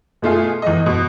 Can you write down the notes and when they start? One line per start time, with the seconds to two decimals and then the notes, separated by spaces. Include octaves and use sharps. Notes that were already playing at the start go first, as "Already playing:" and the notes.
0.22 B2 A3 F4 G#4
0.62 E2 D#5
0.86 B2